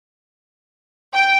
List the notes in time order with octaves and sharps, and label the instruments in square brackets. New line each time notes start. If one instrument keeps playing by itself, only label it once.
[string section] G5